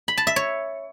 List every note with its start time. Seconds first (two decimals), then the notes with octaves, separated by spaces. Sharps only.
0.08 B5
0.17 A5
0.27 E5
0.36 C#5